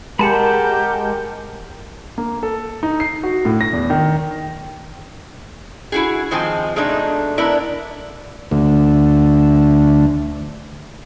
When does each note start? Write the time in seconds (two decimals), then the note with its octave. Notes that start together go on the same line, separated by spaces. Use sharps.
0.19 G#3 G4 A#4 F#5 A5 B5
2.18 A#3
2.43 A4
2.83 D#4
3.00 C7
3.23 F#4
3.45 A2
3.61 A#6
3.73 E2
3.90 D#3
5.92 E4 F#4 G#4
6.31 D#3 F3 G#3 C4 G#5 A5
6.76 B2 G#3 A3 D4 D#4
7.38 B3 D4 E4 A#4 D5
8.51 D2 D3 A3